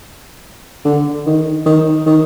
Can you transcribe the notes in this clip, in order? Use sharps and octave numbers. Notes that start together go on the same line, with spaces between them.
D3
D#3
D#3
D#3